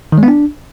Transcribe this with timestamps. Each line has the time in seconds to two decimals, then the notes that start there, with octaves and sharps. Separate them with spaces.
0.12 D#3
0.18 G#3
0.23 B3
0.28 D4